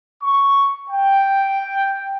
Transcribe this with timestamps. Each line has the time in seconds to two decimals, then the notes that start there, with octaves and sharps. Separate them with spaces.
0.23 C#6
0.90 G5